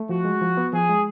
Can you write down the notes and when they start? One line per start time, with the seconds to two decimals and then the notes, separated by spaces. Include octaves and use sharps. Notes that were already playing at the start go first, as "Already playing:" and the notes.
Already playing: A3
0.09 F3 F#4
0.25 G#3
0.42 F3
0.57 B3
0.73 F3 G#4
0.89 G#3